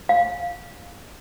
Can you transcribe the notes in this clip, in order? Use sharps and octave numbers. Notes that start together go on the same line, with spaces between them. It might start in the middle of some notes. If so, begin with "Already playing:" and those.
F5